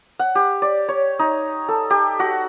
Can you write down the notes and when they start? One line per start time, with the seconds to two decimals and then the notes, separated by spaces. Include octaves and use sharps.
0.19 F#5
0.35 G4
0.62 D5
0.88 C#5
1.19 D#4
1.69 A4
1.90 G4
2.20 F#4